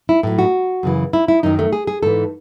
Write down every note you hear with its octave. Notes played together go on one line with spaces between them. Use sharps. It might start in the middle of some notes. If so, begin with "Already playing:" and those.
E4
A2 F#3
F#4
F#2 C#3 E3
E4
E4
F#2 D#3 F#3 D#4
A3
G#4
G#4
G#2 E3 A4